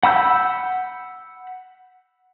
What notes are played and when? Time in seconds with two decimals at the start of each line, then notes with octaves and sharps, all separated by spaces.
0.03 F#5 B5 E6 G6